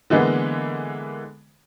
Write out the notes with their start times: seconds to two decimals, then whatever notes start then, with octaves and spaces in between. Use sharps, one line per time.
0.10 D3 E3 G#3 A#3 B3